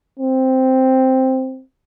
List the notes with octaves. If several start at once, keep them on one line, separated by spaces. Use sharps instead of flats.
C4